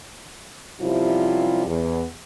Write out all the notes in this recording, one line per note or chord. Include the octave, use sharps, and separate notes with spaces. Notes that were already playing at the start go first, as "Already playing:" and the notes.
F#2 C3 F3 G3 E4 F4
E2